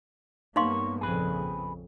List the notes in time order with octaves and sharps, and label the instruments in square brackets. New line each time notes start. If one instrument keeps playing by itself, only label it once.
[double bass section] G2 A#3 B3 [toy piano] D#4 F5 C6 [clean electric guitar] C#5
[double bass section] A#1 F2 C#3 [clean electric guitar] G#4 B4